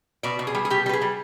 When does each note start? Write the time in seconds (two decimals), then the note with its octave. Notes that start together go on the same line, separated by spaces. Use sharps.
0.23 B2 D5
0.39 B2
0.47 G#4
0.55 G3
0.65 G#4
0.70 B2 G4
0.86 G3
0.89 B4
0.93 G#4
1.02 G3